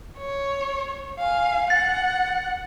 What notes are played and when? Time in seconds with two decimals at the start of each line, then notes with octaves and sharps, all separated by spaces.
0.18 C#5
1.19 F5 G#5
1.70 F#5 A6